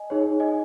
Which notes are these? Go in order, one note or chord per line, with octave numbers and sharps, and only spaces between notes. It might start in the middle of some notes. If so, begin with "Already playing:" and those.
Already playing: D#5 G#5
D#4 G#4 C#5
D#5 G#5